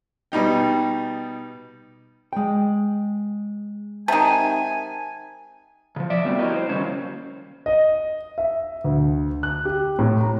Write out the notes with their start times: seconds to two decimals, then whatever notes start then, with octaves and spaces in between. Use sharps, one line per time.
0.32 B2 G3 D#4 G5
2.33 G#3 G5
4.08 C3 D#3 G#5 A5
5.96 C#3 F3
6.10 D5 E5
6.25 G3 A3 B3 C4 F#4
6.39 E4 F#4 G4 A#4 C#5 D#5
6.56 C5
6.69 D#3 E3 F#3 G3 A#3 C#4
7.66 D#5
8.38 E5
8.84 D2
9.43 F#6
9.65 G4
9.99 A2
10.21 A#5